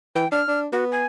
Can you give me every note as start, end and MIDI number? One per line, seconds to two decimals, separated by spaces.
0.16 0.25 52
0.16 0.28 79
0.32 0.42 62
0.32 0.59 89
0.48 0.67 62
0.72 1.06 59
0.72 0.84 66
0.92 1.06 80